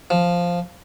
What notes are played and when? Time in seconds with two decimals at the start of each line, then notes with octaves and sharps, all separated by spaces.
0.10 F3